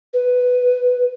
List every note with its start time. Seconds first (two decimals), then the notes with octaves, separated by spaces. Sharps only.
0.14 B4